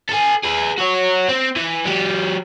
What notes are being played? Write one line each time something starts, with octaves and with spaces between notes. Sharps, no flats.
A4 G#5
G#4 B4
F#4 C#5
C4
E3
F#3 G4